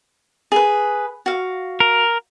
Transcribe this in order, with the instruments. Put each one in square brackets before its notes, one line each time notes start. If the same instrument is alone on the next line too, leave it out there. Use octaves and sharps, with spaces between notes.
[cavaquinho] G#4 B4
F#4 F5
[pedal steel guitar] A#4